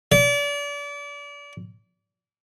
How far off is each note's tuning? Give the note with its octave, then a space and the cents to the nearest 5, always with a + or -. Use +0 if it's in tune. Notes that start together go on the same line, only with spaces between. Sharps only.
D5 -35